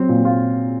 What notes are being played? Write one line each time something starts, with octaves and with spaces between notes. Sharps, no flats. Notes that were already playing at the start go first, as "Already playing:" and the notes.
Already playing: F#3 C4
A#2
F4